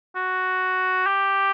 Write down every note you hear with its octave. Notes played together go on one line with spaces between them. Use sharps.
F#4
G4